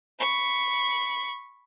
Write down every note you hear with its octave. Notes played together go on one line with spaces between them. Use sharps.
B5 C#6